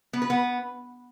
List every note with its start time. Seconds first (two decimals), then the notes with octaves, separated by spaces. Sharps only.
0.13 B3
0.22 B4
0.30 B3